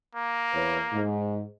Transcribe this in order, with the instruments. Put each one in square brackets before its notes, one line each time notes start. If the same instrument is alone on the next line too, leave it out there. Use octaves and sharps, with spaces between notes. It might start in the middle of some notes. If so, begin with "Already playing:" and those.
[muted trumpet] A#3
[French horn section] E2 B4 C#5
G#2